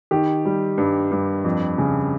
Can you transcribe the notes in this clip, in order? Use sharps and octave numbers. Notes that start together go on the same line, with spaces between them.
D#3 G4
G3
G2
G2
F2
C#3